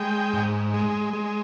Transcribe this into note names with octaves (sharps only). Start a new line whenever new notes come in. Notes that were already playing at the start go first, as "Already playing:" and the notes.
Already playing: G#3 G5
G#2
G#3
G#3